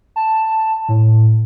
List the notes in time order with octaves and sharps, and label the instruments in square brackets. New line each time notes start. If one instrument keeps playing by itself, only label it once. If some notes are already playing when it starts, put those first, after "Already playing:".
[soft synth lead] A5
A2